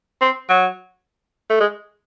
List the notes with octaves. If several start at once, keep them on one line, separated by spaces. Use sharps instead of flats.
C4
F#3
A3
G#3